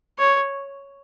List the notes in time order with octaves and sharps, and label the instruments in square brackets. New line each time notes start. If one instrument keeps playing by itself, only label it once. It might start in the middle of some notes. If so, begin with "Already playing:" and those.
[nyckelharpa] C#5